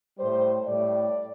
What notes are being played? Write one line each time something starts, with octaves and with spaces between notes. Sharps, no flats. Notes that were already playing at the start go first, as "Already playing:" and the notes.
A2 G3 C5
A2 G3 D5